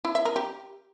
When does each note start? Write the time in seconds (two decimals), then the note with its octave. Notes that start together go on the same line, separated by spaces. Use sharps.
0.05 E4
0.15 E5
0.25 A#4
0.36 G4